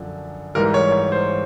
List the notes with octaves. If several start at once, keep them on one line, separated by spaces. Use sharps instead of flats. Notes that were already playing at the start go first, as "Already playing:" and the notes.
Already playing: F#2 D3 F3
G#2 E3 G3 A#4
C#5
C#5
C5